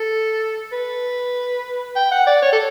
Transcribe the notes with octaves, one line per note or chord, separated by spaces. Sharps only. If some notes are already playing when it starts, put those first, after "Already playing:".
Already playing: A4
B4
G5
F#5
D5
C#5
A4